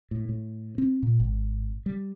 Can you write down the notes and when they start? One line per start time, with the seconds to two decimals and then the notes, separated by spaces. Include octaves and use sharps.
0.11 A2
0.29 A2
0.78 C4
1.03 A#2
1.20 G#1
1.86 G3